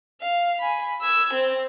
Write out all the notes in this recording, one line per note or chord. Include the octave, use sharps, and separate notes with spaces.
F5
G#5 B5
E6 G#6
C4